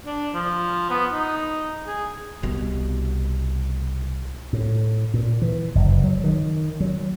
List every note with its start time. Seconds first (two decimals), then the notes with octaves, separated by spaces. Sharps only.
0.06 D4
0.34 F3
0.90 B3
1.13 D#4
1.88 G#4
2.43 C2 B2
4.53 A2
5.14 A#2
5.42 E3
5.75 F#1
6.04 F#3
6.24 D#3
6.80 F#3